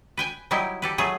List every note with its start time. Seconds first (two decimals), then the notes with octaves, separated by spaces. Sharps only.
0.17 B4 G5 G#5
0.51 F#3 G3 D#4 E4 G4
0.82 G4 A4 B4
0.98 F#3 A3 G#4 B4